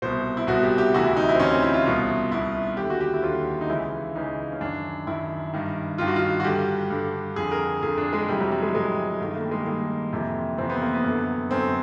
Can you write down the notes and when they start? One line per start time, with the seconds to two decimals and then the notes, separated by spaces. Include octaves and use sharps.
0.02 C2 B2 C5
0.37 E4
0.47 C2 B2 F#4
0.63 G4
0.78 G4
0.94 D2 C3 E3 F#4
1.06 E4
1.17 D#4
1.29 E4
1.35 C4
1.40 D2 C3 E3 C#4
1.51 C4
1.62 E4
1.74 F4
1.86 C2 B2 F4
2.31 C2 B2 E4
2.77 D#2 D3 G4
2.90 F#4
3.00 G4
3.14 E4
3.23 D#2 D3 F4
3.61 D#4
3.69 C#2 C#3 E3 E4
4.16 C#2 C#3 E3 D#4
4.52 C#4
4.61 F#2 D#3 D4
5.07 F#2 D#3 E4
5.53 G2 D#3
5.98 G2 D#3 F4
6.08 F#4
6.16 F4
6.40 F#4
6.44 G2 D3 G4
6.90 G2 D3
7.36 F2 D3 G#4
7.51 A#4
7.82 F2 D3 G#4
7.98 D4
8.13 G#3
8.28 F2 C3 E3 G3
8.40 F#3
8.52 G3
8.62 G#3
8.75 F2 C3 E3 G#3
9.21 G2 D#3 A3
9.31 A3
9.35 A#3
9.45 G3
9.51 G#3
9.66 G2 D#3 A#3
10.13 F2 C3 E3
10.58 F2 C3 E3 C4
10.70 B3
10.82 A#3
10.94 B3
11.04 F#2 D3
11.49 F#2 D3 C4